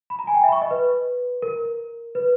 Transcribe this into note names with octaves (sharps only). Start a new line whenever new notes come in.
B5
A#5
G#5
G5
E5
B5
C#6
D#5
B4
A#4
B4